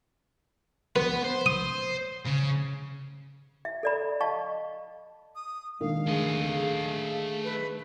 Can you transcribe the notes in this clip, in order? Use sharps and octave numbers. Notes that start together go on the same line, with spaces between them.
B3 B4
C5
D#6
C#3
E5
A4 D5 B5
D#5 F5 A5 C#6
D#6
D#3 G#3 A#3 D4 F5
A3 G#4 D#5
G#4
B4